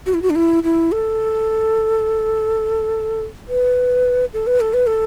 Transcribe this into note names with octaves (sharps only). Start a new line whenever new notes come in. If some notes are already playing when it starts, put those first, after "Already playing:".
F#4
E4
F#4
D4
E4
E4
A4
B4
A4
B4
A4
B4
A4